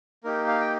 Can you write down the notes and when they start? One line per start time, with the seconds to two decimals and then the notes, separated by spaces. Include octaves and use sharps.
0.24 A#3 D#4 G4 A#4
0.47 F5
0.60 G5